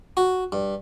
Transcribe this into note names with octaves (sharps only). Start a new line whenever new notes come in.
F#4
G2